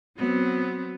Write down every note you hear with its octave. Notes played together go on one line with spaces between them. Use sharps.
F#3 B3 C4